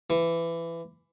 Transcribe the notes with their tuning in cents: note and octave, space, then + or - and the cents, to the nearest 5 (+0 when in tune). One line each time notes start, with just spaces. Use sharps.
E3 +20